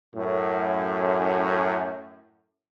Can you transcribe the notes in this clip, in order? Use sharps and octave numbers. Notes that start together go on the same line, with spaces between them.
F#2 A2